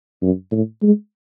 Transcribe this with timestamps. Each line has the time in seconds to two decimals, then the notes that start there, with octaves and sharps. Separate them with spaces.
0.22 F#2
0.52 A2
0.83 G#3